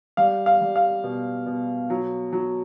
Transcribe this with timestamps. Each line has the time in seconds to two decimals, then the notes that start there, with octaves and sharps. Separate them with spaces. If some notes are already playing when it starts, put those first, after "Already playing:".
0.17 G3 F5
0.46 F5
0.61 G3
0.76 F5
1.04 B2
1.46 B2
1.90 F#3
2.33 F#3